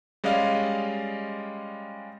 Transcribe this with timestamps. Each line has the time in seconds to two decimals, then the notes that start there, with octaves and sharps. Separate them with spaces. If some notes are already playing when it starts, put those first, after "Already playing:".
0.24 G3 G#3 C#4 D5 D#5 F5